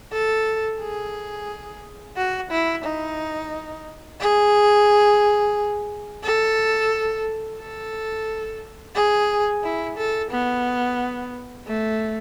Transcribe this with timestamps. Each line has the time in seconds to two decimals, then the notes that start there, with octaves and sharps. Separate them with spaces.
0.13 A4
0.81 G#4
2.16 F#4
2.51 E4
2.84 D#4
4.21 G#4
6.24 A4
7.59 A4
8.95 G#4
9.63 E4
9.97 A4
10.31 B3
11.67 A3